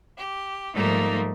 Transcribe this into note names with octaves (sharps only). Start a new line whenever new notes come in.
G4
G#2 F3 G3 A3 A#3 D#4